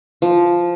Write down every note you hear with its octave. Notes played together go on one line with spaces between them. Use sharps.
F3